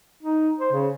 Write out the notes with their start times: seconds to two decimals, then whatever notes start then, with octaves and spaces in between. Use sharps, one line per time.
0.23 D#4
0.60 C5
0.72 C#3